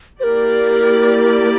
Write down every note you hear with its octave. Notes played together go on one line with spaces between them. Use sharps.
A#3 E4 G4 A#4 C5 D5